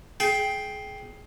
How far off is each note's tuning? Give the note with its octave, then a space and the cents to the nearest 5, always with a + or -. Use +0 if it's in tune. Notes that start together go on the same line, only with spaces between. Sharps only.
G#4 +20 G5 +0